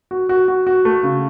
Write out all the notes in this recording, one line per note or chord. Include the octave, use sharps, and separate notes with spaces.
F#4
F#4
F#4
F#4
A3
C#3